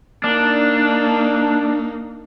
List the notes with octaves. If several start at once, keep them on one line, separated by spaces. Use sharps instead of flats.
A#3 D4 D#4